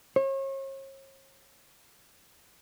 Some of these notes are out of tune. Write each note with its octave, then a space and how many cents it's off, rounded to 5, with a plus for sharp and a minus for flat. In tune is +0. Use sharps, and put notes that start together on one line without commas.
C#5 -40